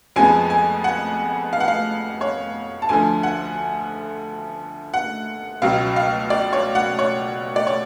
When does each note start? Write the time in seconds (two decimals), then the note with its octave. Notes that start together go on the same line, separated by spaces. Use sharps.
0.16 F2 F3 G#3 B3 G#5
0.50 G#5
0.84 F#5
1.53 F5
1.60 F#5
1.68 F5
2.21 C#5
2.82 A5
2.89 D2 D3 F3 G#5
3.23 F#5
4.94 F#5
5.62 C#2 B2 F#3 F5
5.96 F5
6.30 D5
6.53 C#5
6.75 F#5
6.99 C#5
7.56 D5
7.67 C#5